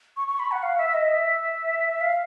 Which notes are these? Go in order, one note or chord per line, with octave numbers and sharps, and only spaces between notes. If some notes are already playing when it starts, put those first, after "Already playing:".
C#6
C#6
B5
F#5
F5
E5
D#5
E5
F5